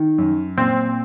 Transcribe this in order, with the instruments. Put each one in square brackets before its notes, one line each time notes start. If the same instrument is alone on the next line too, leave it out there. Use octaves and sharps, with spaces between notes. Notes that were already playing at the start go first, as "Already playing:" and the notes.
Already playing: [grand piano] D#3
F#2
[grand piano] A#2 [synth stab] C4